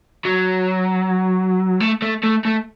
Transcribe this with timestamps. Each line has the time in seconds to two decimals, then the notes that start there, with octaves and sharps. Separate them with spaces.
0.25 F#3
1.80 A3
2.02 A3
2.23 A3
2.45 A3